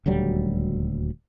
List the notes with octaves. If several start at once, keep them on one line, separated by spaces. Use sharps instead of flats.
D#1 D2 F#3 G3